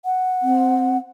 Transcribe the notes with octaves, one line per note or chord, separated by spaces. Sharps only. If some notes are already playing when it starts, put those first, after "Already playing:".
F#5
C4